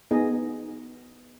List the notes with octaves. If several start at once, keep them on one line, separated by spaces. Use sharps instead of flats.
B3 D#4 G#4 D#5